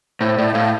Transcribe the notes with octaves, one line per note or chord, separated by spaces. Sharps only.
A2 C5
A2 D5
E5
A2 F5